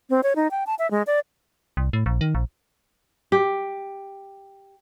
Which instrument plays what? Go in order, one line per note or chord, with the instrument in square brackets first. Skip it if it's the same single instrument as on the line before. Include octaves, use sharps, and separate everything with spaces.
[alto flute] C4
C#5
D#4
G5
A5
E5
G#3
D5
[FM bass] C2
A2
A#1
D#3
A#1
[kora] G4